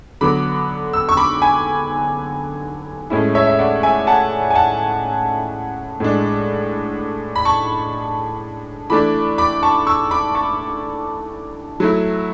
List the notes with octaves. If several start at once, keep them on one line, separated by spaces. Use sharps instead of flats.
D3 F#3 B3 B5 D6
E6
C#6 E6
B5 D6
G#5 B5
A2 G#3 C#4 E4
C#5 E5
E5
D5 F#5
E5 G#5
F#5 A5
G#5
F#5 A5
A2 G#3 D4
B5
A5 C#6
E3 A3 D4 B5 D6
B5 D6
A5 C#6
C#6 E6
B5 D6
A5 C#6
F#3 A3 E4